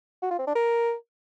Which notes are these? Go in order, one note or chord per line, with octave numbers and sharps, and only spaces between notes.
F#4
F4
C4
D4
A#4